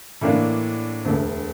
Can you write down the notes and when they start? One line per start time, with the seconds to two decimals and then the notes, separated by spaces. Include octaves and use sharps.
0.21 A2 E3 A#3 D4
1.05 E1 D2 D3 A3